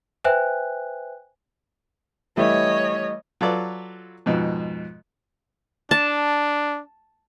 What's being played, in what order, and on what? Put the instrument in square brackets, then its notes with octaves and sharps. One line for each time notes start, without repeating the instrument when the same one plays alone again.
[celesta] B4 C5 E5 G5 G#5 F#6
[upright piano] E3 G3 A3 [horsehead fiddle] C#5 D#5
[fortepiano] F#3 F4 A4 B4 D5
F2 G#2 B2 F3
[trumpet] D4 [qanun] A5